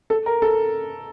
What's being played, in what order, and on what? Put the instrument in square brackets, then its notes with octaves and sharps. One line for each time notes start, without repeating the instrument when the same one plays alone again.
[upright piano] A4
A#4
A4